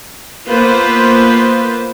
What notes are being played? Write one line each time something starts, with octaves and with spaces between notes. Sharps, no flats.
A#3 B3 F4 B4 C5